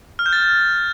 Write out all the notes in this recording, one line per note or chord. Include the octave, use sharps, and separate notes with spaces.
F6
G6
A6